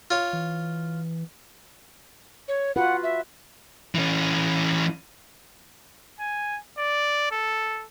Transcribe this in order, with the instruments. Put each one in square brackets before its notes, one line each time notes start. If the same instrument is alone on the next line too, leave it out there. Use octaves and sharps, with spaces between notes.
[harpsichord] F4 C#5
[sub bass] E3
[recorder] C#5
[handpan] F4 F#4 B4 [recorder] F#5
[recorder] E5
[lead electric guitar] E3 C#4
[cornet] G#5
D5
A4